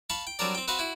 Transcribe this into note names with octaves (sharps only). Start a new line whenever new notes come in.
F5 A5 B5 C#6
G5
F#3 G3 C4 D4 A#4 D5
C4 G5
C4 F#4 B4 C5 F5 B5
E4 F#4